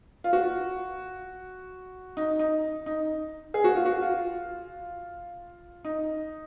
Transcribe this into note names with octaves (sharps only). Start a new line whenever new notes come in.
F4
F#4
D#4
D#4
D#4
G#4
F#4
F4
F#4
F4
D#4